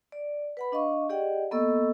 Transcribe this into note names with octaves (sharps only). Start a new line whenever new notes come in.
D5
B4 F#5 B5
D4 D#5 F5 C#6
G4 G#4 D5 D#5 F#5 G5
A#3 B3 A4 D#5 C#6 E6